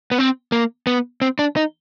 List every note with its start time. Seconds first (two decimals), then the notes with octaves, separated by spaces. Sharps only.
0.12 B3
0.18 C4
0.52 A#3
0.87 B3
1.22 C4
1.39 D4
1.56 D#4